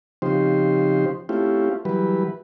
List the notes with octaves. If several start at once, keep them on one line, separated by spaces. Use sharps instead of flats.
C#3 F3 C4 D#4 G4 C5
A3 C4 C#4 E4 F4 G4
E3 F#3 G3 B4